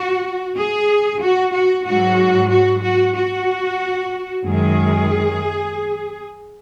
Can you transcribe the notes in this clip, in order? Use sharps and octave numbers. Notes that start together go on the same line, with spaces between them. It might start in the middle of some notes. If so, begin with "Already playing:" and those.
Already playing: F#4
G#4
F#4
F#4
G#2 F#3 F#4
F#4
F#4
F#4
F#2 D#3 G#3 G#4